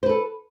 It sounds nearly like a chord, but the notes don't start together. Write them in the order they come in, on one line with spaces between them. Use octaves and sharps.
C5 B4 A4